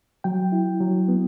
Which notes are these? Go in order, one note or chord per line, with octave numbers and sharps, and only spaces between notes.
F#3 G5
E4
F#3
B3